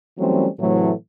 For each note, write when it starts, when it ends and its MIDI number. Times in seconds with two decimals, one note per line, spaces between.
0.19 0.48 52
0.19 0.48 54
0.19 0.48 55
0.19 0.48 57
0.19 0.48 60
0.19 0.48 61
0.59 0.91 45
0.59 0.91 48
0.59 0.91 52
0.59 0.91 54
0.59 0.91 57